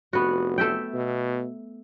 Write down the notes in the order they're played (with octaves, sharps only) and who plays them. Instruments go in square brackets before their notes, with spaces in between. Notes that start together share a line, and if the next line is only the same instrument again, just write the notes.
[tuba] F1 [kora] B3 F#4
[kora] A3 E5 G5
[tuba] B2